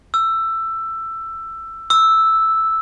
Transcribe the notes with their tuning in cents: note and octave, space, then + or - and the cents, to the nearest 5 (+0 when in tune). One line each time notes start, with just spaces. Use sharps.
E6 +15
E6 -5